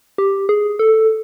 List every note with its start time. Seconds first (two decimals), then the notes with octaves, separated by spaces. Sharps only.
0.18 G4
0.49 G#4
0.79 A4